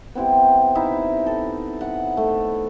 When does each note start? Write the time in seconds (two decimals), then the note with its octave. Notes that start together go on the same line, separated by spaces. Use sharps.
0.15 B3 C4 E4 G4
0.75 D#4 E4 E5
1.26 A4
1.81 F#5
2.17 A3